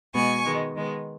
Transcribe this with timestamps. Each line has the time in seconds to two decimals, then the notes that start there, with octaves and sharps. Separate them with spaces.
0.14 B2 G#3 B3 G#5 C#6
0.45 D#3 G#3 B3
0.75 D#3 G#3 B3